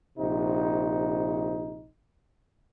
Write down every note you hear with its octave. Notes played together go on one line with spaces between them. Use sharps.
A#1 C3 D#4